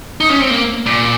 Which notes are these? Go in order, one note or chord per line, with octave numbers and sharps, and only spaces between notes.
D#4
C#4
C4
A#3
A#2